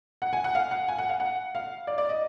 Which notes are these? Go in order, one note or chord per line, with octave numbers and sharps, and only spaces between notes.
F#5
G#5
F#5
F5
F#5
G#5
F#5
F5
F#5
F5
D5
D5
D#5